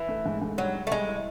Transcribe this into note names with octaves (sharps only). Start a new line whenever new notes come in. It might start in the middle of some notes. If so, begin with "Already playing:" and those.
Already playing: E3
A3
G#2
G#2
F#3 G3
G3
A3
G3 G#3
E4